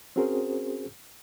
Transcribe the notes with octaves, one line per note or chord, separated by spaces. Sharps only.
C4 C#4 F#4 G#4 A#4 C5